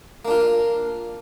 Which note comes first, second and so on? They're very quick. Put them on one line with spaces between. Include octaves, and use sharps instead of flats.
A#3 D4 F4